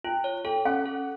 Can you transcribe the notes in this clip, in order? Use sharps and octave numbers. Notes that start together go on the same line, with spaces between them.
F4 G5
C#5
A4 G5
C#4 F#5
A4